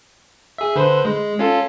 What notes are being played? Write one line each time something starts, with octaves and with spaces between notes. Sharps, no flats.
G#4 E5
D3 B4 C5
G#3
C#4 F4 A4